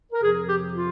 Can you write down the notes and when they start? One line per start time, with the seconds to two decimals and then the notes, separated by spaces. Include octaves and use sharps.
0.12 A#4
0.22 F2 C3 F3 G#4
0.47 G4
0.72 F4